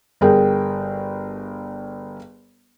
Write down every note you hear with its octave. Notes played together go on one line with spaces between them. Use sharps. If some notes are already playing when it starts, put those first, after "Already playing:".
G1 G#4 A#4 G5